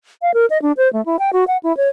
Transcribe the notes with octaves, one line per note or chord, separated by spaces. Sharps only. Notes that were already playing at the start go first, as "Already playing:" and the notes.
F5
A#4
D#5
D4
C5
A3
E4
G5
F#4
F#5
E4
C#5